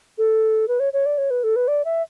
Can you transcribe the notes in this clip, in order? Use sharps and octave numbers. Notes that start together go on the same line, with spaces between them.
A4
B4
C#5
C#5
D5
C#5
B4
A4
B4
D5
E5